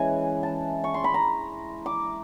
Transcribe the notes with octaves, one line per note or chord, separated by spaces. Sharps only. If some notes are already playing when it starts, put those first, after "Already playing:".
Already playing: E3 G#3 C#4 G#5
A5
C#6
C6
B5
A#5
D6